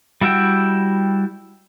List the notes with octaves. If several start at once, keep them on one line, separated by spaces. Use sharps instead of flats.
G3 E4 F#4 E5 G5